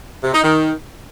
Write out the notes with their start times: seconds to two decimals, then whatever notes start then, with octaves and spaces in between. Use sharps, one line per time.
0.23 C3
0.33 D#4
0.44 D#3